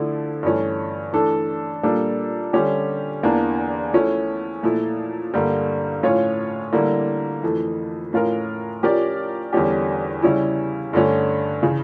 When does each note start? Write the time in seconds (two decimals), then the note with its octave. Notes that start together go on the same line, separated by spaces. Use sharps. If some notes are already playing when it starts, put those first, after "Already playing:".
Already playing: D3 F3 A3 E4
0.43 G2 E3 A3 C#4
1.13 E3 A3 D4 A4
1.83 A#2 G3 A#3 D4 A4
2.53 D3 G3 C#4 G4
3.23 E2 E3 A#3 D4
3.93 F3 A3 C#4 E4
4.63 A#2 F3 A3 E4
5.34 G2 D3 G3 A#3
6.03 A2 F3 C#4 F4 C#5
6.73 D3 G3 A#3 E4
7.43 F2 E3 A3
8.13 A2 F3 C#4 F4 A#4
8.83 F3 C#4 G4 A#4 D5
9.53 E2 D3 G3 C#4 G4
10.22 C#3 G3 C#4 E4
10.93 G2 D3 A3 C#4
11.63 C#3 E3